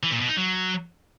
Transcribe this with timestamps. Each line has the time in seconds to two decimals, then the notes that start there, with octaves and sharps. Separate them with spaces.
0.03 E3
0.12 A#2
0.20 B2
0.29 D#4
0.37 F#3